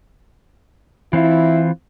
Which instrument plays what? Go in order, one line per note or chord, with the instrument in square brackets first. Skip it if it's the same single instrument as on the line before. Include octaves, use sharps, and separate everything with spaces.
[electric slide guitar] E3 C4 F4 [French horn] E4